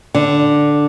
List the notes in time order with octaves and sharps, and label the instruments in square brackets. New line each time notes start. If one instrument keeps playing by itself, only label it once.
[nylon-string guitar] D3